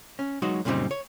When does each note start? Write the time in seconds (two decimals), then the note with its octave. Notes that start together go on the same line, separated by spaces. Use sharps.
0.19 C#4
0.42 F#3 G#3 D#4 F#4 C#5
0.65 F#2 A#2 C#3 G3 C4 D#4
0.91 C#5